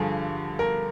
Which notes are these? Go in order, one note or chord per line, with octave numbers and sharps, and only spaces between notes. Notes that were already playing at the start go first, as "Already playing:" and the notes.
Already playing: G2 D3 F3 G#4
A#4